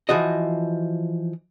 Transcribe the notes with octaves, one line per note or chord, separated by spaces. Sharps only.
E3 F3 F#4 D#5